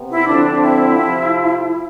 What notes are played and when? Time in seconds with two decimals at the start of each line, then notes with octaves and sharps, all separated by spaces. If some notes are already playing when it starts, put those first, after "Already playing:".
Already playing: C3 B3
0.11 E4
0.27 D3 F3 C4 D4
0.62 E4
0.97 F2 C3 F3
1.65 E4